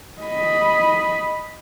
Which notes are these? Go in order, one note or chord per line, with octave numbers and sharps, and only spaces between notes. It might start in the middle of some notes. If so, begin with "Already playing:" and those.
D#5 B5